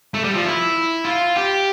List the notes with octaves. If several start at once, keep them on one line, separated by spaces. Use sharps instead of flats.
A3
G3
F3
E4
F4
G4